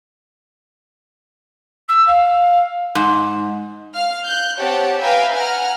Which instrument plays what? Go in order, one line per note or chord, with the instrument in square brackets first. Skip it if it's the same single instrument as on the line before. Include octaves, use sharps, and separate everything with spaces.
[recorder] E6
F5
[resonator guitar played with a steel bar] G#2
[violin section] F5 F6
F#6 G6
C4 G4 C#5 F#5 A5
B4 E5 F5 G5 G#5 A#5
F#5 G#5 A#5 F6